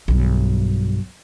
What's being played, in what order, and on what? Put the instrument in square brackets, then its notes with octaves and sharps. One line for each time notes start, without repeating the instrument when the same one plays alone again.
[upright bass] B1 G2